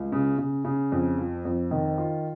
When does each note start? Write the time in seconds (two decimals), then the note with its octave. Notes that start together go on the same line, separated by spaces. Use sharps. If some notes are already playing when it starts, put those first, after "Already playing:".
Already playing: C#2
0.12 C#3
0.38 C#3
0.65 C#3
0.92 F2
1.18 F3
1.45 F2
1.71 D#3
1.98 F4